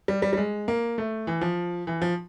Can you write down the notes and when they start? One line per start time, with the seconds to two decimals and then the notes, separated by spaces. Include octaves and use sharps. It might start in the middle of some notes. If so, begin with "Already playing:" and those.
0.08 G3
0.22 G3
0.33 G3
0.37 G#3
0.68 A#3
0.98 A3
1.27 E3
1.41 F3
1.87 E3
2.02 F3